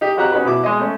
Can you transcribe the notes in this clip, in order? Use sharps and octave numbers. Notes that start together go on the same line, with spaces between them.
D#4 G4
F2 F#4 G4 A#5 F#6
C#4 D#4 F#4 B4
B2 E4 D6
G#3 D#5
A3 C#4